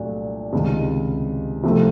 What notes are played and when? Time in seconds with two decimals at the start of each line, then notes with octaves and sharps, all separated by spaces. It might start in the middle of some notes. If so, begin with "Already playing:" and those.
Already playing: C2 A#2 F#3 A3 D4
0.53 C#2 C3 D#3
1.64 C2 C3 F3 A3 C4